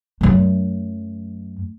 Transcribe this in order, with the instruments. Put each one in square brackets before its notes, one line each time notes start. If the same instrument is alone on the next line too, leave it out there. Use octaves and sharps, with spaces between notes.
[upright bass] F#2 A3